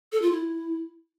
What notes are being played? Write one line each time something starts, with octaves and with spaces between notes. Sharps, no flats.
A4
F4
E4